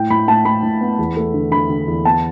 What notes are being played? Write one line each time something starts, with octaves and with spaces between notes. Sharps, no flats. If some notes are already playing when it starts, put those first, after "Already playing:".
Already playing: A2 G5
A2 B5
A2 A5
A2 B5
A2
B3
E2
A3
D3
D3 B5
D3
E2
B3 A5